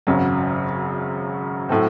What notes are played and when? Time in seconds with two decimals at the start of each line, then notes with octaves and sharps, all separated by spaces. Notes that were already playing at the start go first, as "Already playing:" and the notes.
0.07 G#1 F#2 C#3 F#3
1.69 A2 F#3 A3 C4